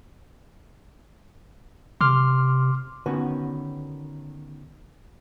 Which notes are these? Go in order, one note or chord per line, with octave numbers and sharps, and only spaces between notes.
C3 C6 D6 F6
D3 D#3 B3 C#4 F#4 B4